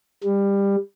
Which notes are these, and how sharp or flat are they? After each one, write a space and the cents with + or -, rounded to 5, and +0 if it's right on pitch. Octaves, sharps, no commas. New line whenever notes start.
G3 +20